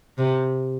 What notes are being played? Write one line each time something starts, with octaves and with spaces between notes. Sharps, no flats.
C3